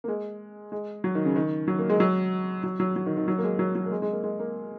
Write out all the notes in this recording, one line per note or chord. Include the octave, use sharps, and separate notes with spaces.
A#3
G#3
G#3
F#3
D#3
C#3
D#3
F#3
A#3
G#3
F#3
F#3
F#3
F#3
D#3
D#3
F#3
A#3
G#3
F#3
F#3
A#3
G#3
G#3
A#3
G#3
A#3